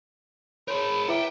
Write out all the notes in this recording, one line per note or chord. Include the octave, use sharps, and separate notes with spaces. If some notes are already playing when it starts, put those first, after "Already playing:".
G#4 A#4 C#5 B5 C6
E4 B4 E5 F#5 G5 D6